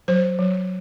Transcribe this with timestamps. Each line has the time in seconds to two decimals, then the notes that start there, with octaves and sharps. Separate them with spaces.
0.08 F#3 C5
0.39 F#3